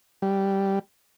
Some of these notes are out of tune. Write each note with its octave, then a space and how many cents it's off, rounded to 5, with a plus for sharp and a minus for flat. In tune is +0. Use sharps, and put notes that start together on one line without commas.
G3 -5